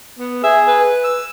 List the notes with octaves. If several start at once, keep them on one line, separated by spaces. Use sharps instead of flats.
B3
G#4 E5
B4
E6